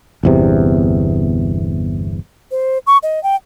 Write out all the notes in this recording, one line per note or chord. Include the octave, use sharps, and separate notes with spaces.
G1 E2 C3
C5
C#6
D#5
G5